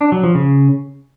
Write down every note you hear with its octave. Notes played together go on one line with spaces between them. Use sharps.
D4
F#3
F3
C#3